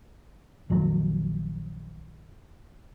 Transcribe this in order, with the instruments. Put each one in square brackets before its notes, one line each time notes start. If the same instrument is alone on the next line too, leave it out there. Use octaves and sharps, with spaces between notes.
[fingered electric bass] A#1 F2 D#3 F#3